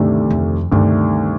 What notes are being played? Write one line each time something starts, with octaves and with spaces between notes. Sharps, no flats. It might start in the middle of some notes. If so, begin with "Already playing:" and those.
Already playing: D2 G2 C3 D#3 A3 D4
F2
D2 G2 C3 D#3 A3 D4